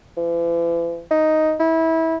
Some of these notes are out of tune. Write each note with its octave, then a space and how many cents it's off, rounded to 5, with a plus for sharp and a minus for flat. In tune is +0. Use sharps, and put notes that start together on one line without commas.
E3 +45
D#4 +5
E4 -25